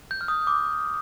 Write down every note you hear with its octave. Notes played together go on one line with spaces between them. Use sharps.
G6
F6
D#6
D6